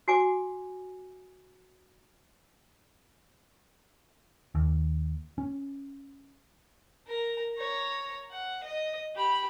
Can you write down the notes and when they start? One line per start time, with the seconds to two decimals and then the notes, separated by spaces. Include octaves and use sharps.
0.08 F#4 G#5 D6
4.55 D#2
5.38 C#4
7.07 A#4 A#5
7.55 C#5 A#5
8.31 F#5
8.64 D#5
9.15 G4 B5